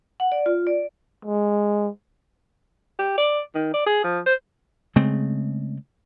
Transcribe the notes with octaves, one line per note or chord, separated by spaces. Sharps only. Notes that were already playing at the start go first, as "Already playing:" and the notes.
F#5
D5
F4
D5
G#3
G4
D5
D#3
D5
G#4
F3
C5
C#3 G#3 A3 C4